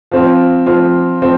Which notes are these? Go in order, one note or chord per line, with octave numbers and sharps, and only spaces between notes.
F3 C4 F4
F3 C4 F4
F3 C4